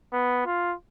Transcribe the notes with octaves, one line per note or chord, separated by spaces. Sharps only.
B3
F4